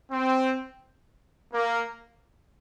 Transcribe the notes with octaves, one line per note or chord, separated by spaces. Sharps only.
C4
A#3